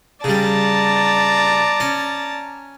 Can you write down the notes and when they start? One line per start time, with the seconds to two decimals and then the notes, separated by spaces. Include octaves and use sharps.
0.24 C#3 G3 D5 A5 A#5
1.80 C#4